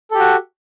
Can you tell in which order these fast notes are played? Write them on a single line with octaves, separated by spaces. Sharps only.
A4 G4 F#4